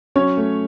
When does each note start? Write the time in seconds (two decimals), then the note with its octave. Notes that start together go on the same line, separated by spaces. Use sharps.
0.16 F#3 C#4 C#5
0.37 A3